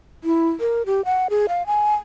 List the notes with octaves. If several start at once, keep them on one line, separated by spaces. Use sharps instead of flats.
E4
A#4
G4
F#5
G#4
F5
G#5